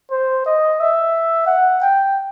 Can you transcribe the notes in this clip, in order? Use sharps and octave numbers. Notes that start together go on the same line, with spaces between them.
C5
D#5
E5
F#5
G5